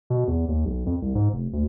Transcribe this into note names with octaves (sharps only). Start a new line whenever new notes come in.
B2
E2
D#2
B1
F2
C2
G#2
F1
D2